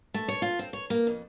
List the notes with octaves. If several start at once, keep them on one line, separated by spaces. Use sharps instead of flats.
A3
C#5
F4
C4
C#5
A#3
F2